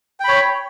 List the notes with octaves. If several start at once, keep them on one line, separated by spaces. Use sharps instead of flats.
C#5 G5 B5